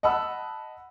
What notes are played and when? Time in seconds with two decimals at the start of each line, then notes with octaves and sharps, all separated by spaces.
0.03 D#5 F#5 A5 B5 E6